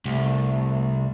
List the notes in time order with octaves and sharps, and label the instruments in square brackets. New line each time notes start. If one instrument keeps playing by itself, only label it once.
[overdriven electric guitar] C2 [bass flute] A3